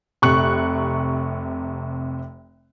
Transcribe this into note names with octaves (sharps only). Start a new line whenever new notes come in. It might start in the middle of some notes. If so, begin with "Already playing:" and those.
F1 C3 C#6 F#6